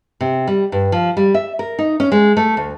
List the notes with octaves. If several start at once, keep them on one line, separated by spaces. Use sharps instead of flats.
C3
G3
G2
F3
G3
E5
A#4
D#4
C#4
G#3
A3
D2